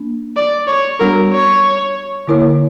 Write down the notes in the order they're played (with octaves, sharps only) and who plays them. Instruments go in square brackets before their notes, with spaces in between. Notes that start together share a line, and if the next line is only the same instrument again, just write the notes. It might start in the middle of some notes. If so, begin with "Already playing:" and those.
Already playing: [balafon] A#3 D4
[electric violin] D5
C#5
[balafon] G3 B3 D4 F#4 [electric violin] A#4
[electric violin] C#5
[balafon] D3 A#3 E4 A#4 C#5